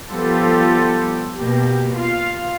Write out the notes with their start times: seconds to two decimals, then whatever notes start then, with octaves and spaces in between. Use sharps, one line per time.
0.10 F3 G3 B3 F4 G4 A4
1.36 B2 A#3 G4
1.97 F4 F5